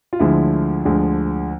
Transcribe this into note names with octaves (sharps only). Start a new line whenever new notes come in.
F4
D2 D3 F3 G#3 E4
D2 D3 F3 G#3